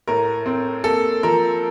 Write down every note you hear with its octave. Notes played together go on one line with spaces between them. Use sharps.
A2 A#4
C4
A#3 A4
F3 A#4